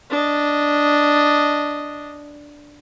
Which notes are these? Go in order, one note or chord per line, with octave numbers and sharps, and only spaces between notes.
D4 D#5